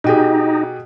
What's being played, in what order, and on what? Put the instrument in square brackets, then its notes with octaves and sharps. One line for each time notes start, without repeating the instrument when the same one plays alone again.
[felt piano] B2 G4 G#4 [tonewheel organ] D#4